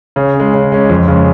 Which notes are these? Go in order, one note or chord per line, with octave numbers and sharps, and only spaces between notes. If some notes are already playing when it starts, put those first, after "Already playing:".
C#3
C#4
G#3
C#3
G#3 C#4
F2
C#3 G#3